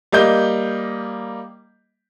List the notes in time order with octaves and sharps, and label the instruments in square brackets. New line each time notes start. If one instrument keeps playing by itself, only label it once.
[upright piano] G3 A#3 D#5 G6